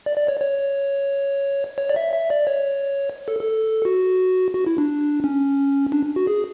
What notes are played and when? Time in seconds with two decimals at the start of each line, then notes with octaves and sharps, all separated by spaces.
0.06 D5
0.17 D5
0.28 C#5
0.40 C#5
1.78 C#5
1.89 D5
1.96 E5
2.14 E5
2.30 D5
2.47 C#5
3.28 A4
3.39 A4
3.85 F#4
4.54 F#4
4.67 E4
4.78 D4
5.24 C#4
5.92 D4
6.16 F#4
6.27 G#4